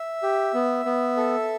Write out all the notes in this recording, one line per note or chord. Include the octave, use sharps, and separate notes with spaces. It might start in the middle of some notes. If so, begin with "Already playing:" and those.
Already playing: E5
G4
B3
B3
A4